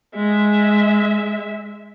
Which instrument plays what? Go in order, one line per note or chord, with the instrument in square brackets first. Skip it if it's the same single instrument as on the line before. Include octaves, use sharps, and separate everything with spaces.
[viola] G#3 E5